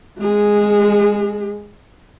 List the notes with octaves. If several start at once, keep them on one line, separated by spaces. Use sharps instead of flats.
G#3 G#4